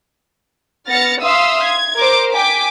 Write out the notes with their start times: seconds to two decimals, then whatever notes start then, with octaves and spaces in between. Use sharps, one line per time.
0.88 B3 F6 A6 A#6 C#7
1.22 E5 F5 C6 D#6 E6
1.63 G#6
1.96 A#4 C5 D6
2.33 G5 G#5 D6 B6